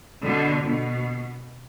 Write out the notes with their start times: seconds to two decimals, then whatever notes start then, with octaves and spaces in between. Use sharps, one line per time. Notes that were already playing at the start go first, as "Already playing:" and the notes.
0.24 B2 D3
0.64 B2